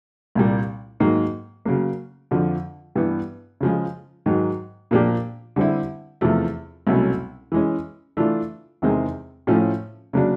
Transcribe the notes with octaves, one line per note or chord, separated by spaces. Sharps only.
C2 A#2 G3
G#2 D#3 F#3 A#3
C#3 F#3 A#3
F2 D3 F3
G2 E3 G3 B3
C#3 F3 G#3
G#2 D#3 F#3
A#2 F3 A#3 D4 G4
D3 G3 C4 E4
E2 C3 F3 A3
C2 B2 F#3 A3 C#4
E3 G#3 C#4
E3 A3 D4 F4
E2 C3 D#3 G#3 C4
A2 F3 A3 C#4 F4
C#3 F#3 A#3 D4